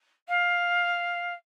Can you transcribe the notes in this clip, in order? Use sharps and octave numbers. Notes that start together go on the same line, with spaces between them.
F5